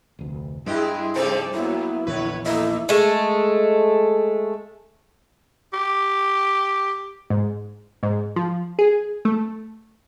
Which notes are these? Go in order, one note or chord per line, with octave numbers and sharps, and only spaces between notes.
F1 D2
G2 G#3 E4 G4 G#4 D#5
C3 F3 D#4 G#4 A4 C5 D5
A2 F#3 A#3 B3 E4
A#1 E2 D3 E3 B4 C#5
A#3 D#4 E4 A4 D#5
G#3 A3
G4
G#2
G#2
F3
G#4
A3